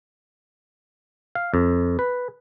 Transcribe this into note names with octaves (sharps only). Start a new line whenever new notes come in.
F5
F2
B4